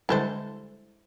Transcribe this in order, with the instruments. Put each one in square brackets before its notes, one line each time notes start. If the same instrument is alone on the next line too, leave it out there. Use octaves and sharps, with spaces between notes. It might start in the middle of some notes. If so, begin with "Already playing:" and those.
[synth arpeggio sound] D3 G3 G#3 [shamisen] E4 A4 C5